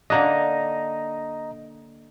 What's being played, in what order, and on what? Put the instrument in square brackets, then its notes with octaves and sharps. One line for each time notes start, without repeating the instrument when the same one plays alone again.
[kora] D3 A#3 D4 [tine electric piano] D#5 A#5